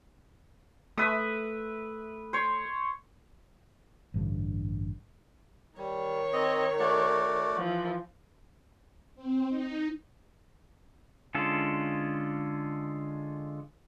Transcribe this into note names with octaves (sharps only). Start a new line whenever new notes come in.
A3 B4 E5 D#6
C5 C#5
A1 G2 D3
D#3 G3 C#5
C4 D#5
A3 F#4 D5
E3 F3
C4
D#4
D3 G#3 C#4 F4 A4